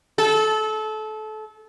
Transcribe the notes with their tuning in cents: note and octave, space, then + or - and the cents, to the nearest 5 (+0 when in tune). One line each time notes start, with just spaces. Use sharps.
A4 -25